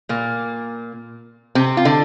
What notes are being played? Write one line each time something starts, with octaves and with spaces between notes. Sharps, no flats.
A#2 A#3
C3 C4
F4
D3 D4